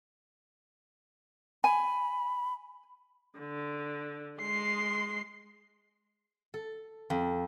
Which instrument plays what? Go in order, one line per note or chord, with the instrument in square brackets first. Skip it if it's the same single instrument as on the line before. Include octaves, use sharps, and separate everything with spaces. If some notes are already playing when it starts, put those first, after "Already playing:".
[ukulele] G#5 [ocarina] B5
[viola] D3
[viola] G#3 C6 [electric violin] C7
[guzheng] A4
F2